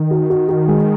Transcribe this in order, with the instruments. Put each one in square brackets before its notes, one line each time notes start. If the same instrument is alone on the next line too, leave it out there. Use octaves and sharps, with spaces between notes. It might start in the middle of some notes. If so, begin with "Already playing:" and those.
Already playing: [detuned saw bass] D#3
[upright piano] F#4
F#4
F#4
G#3